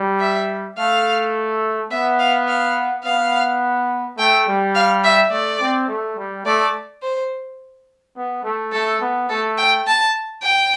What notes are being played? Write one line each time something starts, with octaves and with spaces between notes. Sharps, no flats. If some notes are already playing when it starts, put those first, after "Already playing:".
Already playing: G3
E5
A3 F5
B3 E5
F5
F5
B3 F5
A3 G5
G3
F5
E5
A3 D5
C4
A3
G3
A3 D5
C5
B3
A3
A3 A4
B3
A3 A4
G5
A5
G5